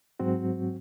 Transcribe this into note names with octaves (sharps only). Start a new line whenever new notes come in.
G#2 F#3 C4 F#4